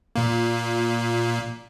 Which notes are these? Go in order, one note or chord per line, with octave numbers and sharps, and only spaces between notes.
A#2 A#3